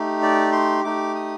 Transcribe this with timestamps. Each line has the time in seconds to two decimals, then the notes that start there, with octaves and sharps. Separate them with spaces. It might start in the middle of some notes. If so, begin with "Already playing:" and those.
Already playing: A3 D#4 G4
0.22 D5
0.52 C6
0.84 A3 D#4 G4 D6
1.16 D#6